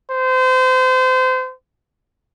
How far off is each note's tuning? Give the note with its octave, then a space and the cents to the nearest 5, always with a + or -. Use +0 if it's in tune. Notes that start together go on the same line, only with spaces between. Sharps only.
C5 -30